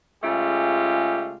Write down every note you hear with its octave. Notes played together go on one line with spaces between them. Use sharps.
C#3 G#3 A3 F4 G4